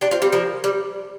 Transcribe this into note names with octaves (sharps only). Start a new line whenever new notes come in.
D4 G4
C4 F4
G3 C4
F3 A#3
G3